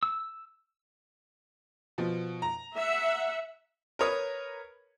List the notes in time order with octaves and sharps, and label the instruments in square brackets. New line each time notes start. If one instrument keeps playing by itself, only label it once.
[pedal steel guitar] E6
[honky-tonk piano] B2 F3
A#5
[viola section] E5 F#5
[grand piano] A#4 B4 C#5 D#6